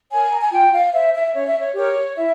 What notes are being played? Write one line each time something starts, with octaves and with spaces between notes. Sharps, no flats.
A#4 C#5 G#5
A#5
G#5
F4 G5
F5
C5 E5
E5
C#4 C#5
E5
C#5
G4 A#4 C#5
E4 E5